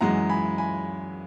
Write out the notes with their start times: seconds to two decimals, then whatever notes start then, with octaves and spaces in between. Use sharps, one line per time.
0.01 F#2 E3 G#3 F#5 A#5
0.29 G#5 B5
0.58 G#5 B5